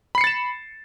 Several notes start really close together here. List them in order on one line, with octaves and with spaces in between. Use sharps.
B5 C7 C#7 A6 E7